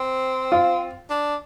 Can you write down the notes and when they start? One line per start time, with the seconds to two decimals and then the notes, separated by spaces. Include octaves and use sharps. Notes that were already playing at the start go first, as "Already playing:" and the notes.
Already playing: C4
0.52 F4
1.10 D4